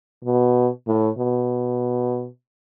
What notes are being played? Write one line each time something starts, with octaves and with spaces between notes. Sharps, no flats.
B2
A2
B2